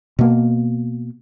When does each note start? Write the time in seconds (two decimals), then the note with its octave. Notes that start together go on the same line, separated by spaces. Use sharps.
0.19 B2 A#3